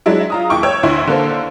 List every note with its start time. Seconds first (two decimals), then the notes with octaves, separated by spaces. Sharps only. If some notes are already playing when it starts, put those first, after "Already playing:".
0.06 F#3 G#3 D4 E4
0.30 F4 A#5 D#6
0.50 D#2 E4 G5 C#6 D6
0.63 C#5 G5 E6
0.83 D2 E4 C6
1.07 D3 A#3 A4 C5